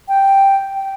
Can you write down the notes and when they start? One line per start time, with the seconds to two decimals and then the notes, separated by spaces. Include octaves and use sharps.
0.08 G5
0.75 G5